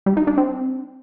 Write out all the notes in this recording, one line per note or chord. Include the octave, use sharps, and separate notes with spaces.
G3
D#4
D4
C4